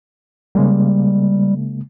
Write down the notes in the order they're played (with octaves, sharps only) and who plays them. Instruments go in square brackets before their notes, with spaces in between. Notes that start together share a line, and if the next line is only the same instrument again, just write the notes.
[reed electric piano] C#3 G#3 A#3 [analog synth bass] G3